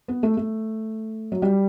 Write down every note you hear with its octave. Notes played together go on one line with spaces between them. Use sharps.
B3
A3
A3
F#3
G3